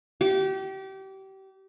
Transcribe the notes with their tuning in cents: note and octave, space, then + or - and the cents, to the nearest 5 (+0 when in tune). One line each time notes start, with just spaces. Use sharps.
G4 -30